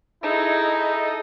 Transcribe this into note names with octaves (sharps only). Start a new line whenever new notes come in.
D#4 E4 G#4 A4 D#5 G6